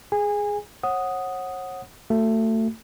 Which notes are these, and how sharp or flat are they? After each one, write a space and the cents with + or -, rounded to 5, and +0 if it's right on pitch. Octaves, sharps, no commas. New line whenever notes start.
G#4 +0 G#5 -25
C#5 -40 F#5 +0 D#6 +0
A3 +20 F#4 +0